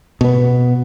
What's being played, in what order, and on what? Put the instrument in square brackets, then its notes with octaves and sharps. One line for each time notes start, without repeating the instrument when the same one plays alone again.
[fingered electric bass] B2 B3